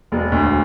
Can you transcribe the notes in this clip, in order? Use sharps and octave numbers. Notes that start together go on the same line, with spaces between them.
E1 G#3
D2